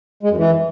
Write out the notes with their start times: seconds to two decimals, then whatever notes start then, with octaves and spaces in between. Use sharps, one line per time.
0.23 G#3
0.30 F#2
0.37 E3